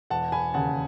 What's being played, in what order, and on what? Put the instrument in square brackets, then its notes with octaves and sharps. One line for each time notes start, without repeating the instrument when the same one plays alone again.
[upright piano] E1 F#5 A5
G#5 B5
D#2 C#3 F#5 A5